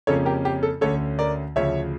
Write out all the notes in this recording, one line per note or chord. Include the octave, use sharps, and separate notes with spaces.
F2 C#3 F3 A#3 C#4 A4 C#5
G4 A#4
G4
A4
D2 D3 A3 C#4 A4 C#5
A#4 D5
D2 C#3 F3 C#5 E5